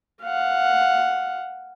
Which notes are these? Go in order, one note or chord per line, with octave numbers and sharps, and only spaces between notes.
F5 F#5